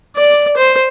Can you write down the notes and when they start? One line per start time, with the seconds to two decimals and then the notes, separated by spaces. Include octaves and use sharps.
0.16 D5
0.57 C5